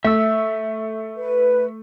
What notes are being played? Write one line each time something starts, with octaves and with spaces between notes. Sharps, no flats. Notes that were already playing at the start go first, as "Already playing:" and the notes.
A3 E5 E6
B4